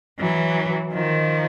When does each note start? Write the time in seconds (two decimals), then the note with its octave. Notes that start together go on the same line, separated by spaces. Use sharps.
0.19 E3 F#3
0.93 D#3 F3